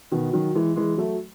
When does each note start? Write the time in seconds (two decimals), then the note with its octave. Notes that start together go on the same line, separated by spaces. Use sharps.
0.11 B2 D#3
0.33 D#3 F#3
0.55 E3 G#3
0.76 E3 G#3
0.97 F#3 A3